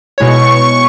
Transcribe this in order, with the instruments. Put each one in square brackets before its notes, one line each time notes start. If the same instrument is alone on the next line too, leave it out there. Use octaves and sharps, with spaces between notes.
[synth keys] B2 G#3 E4 C#5 [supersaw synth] C#6